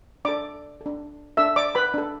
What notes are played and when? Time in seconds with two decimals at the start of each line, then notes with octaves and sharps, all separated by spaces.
0.25 D4 A4 D5 D6
0.81 A4
0.86 D4
1.37 D4 A4 E5 E6
1.56 D5 D6
1.75 B4 B5
1.94 D4 A4